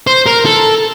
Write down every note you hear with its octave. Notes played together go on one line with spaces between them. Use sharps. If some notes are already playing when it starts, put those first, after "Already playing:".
C5
A#4
A4